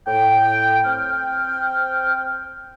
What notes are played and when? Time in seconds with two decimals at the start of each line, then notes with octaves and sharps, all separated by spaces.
0.07 A2 G5
0.85 C4 G5 F6